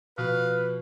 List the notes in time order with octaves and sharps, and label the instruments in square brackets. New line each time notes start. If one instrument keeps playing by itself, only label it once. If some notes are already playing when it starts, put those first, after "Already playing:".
[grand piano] B2 [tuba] F3 [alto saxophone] B4 [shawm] F5